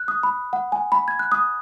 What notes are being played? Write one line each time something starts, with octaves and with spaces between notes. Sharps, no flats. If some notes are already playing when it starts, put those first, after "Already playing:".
Already playing: F#6
D#6
B5
F#5
G#5
B5
G#6
F#6
D#6